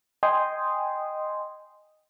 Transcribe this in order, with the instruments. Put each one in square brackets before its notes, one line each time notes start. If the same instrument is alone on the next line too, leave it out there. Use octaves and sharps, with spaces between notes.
[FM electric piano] D#5 G5 G#5 C6 D#6